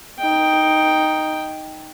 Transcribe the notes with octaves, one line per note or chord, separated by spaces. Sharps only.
D#4 G5